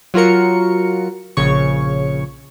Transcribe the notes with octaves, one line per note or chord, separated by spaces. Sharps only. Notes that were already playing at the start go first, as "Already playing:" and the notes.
F#3 F4 F#4 A#4 C#7
A#1 C#3 C#5 C#6